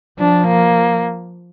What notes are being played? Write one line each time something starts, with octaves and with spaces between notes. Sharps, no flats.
F3 D4
A#3